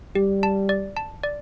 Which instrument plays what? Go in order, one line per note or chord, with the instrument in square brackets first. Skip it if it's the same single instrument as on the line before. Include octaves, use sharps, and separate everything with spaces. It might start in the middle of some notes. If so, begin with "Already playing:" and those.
[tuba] G3 [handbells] G4
[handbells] A5
D5
A5
D5